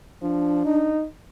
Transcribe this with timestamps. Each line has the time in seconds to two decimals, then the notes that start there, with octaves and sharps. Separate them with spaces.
0.22 F3 D4
0.65 D#4